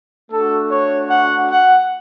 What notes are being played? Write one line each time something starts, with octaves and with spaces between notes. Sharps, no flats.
A3 D4 F#4 A4
C#5
F#5
F#5